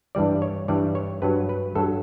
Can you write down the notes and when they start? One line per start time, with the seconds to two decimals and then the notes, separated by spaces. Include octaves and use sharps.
0.15 G2 E3 G3 D5
0.42 C#5
0.68 G2 E3 G3 D5
0.95 C#5
1.22 G2 F#3 B4
1.49 B4
1.75 G2 F#3 A4